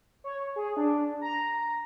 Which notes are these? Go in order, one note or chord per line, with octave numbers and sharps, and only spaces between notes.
C#5
G#4
D4
A#5